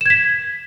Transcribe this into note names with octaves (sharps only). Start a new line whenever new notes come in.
G#6 B6 E7